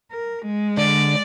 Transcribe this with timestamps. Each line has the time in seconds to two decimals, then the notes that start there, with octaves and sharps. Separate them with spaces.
0.11 A#4
0.46 G#3
0.77 D3 D5